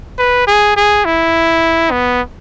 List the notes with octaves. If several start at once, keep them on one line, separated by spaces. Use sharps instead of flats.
B4
G#4
G#4
E4
B3